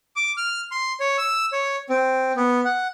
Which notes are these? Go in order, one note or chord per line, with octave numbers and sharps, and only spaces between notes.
D6
F6
C6
C#5
E6
C#5
C4
B3
F#5